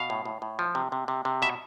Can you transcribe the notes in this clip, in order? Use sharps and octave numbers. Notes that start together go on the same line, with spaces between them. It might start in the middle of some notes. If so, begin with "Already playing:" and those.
Already playing: B2 F5
A2
A2
A2
F3
C3
C3
C3
C3
B2 E5